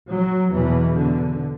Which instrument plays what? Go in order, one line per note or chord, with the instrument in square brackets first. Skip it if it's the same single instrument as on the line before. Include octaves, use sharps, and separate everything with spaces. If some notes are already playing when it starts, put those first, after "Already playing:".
[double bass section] F#3
E2 B2 E3
D3